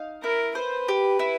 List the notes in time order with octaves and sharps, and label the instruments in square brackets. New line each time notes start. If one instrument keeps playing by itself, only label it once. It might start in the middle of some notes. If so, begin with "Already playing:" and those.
Already playing: [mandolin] D#4 F5
[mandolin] E4 [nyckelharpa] A#4
[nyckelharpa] B4 [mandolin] C5
[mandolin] G4
E4